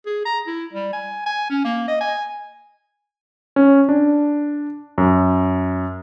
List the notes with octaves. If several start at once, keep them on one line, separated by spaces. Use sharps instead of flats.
G#4
A#5
E4
G3
G#5
G#5
C#4
A#3
D#5
G#5
C#4
D4
F#2